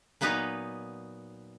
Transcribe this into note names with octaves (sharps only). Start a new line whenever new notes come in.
A#2 F#3 B3 D#4 B4